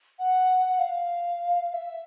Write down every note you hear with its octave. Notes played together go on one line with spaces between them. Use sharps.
F#5
F#5
F5
F5
E5